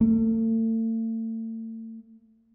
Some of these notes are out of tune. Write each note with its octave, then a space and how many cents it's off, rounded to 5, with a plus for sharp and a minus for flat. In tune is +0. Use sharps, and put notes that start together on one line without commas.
A3 +40